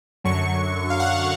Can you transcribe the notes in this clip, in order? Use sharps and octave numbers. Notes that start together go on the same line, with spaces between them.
F#2 D3 F#3 C#6
F5
F#5